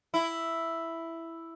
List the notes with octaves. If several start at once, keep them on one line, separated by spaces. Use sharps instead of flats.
E4